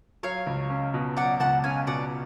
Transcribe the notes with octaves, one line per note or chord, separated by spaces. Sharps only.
F#3 C#5 F5
C#2
C#4
B2
F#3 D5 F#5
C#2 F#5 A5
C#4 F5 G#5
B2 D5 F#5